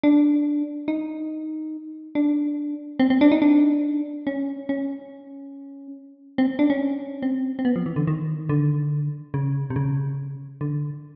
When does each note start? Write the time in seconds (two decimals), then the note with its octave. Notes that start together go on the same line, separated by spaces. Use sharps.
0.03 D4
0.88 D#4
2.15 D4
3.00 C4
3.10 C4
3.21 D4
3.32 D#4
3.42 D4
4.27 C#4
4.69 C#4
6.38 C4
6.59 D4
6.70 C#4
7.23 C4
7.59 C4
7.65 B3
7.76 F3
7.86 E3
7.96 D3
8.07 D#3
8.49 D3
9.34 C#3
9.70 C3
9.76 C#3
10.61 D3